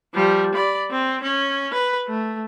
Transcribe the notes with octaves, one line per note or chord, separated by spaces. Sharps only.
F3 G3
D5 B5
C4
C#4
B4
A3